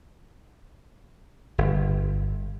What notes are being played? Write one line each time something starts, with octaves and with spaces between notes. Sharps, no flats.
G1